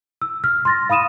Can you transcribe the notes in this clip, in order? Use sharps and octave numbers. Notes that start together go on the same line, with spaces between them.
E6
F6
C6 A6 A#6
F5 B5 D#6 D#7 E7